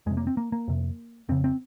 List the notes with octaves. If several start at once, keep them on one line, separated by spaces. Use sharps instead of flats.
F2 C3 G#3
A#3
C4
A#3
A#3
F2 C3
F2 C#3 C4
C4